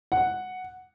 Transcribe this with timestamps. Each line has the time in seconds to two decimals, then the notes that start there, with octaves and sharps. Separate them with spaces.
0.12 F#5